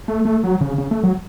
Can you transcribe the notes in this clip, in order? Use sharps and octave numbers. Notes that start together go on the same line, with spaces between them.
A3
A3
F#3
C#3
C#3
A3
F#3